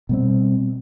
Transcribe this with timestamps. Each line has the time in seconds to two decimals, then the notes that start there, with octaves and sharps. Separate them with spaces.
0.09 B2 G3 C4